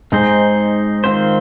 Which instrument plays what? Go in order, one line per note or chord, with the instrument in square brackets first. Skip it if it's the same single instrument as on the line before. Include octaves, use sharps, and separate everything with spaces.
[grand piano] G#2 [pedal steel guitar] C4 D#4 G#4 C5
[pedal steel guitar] D#3 C4 F4 C5